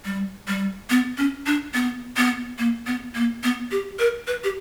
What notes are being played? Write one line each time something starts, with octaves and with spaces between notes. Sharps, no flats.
G3
G3
B3
C#4
D4
B3
B3
A#3
B3
A#3
B3
G4
A#4
B4
G4